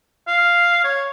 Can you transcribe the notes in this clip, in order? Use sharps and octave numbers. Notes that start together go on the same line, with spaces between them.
F5
C#5